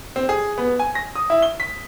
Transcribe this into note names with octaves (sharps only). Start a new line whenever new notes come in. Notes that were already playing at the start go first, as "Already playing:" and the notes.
C4
G#4
B3
G#5
A#6
D#6
E4
G7
B6